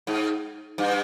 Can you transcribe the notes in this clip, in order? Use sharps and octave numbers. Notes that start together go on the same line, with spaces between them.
G#2
G2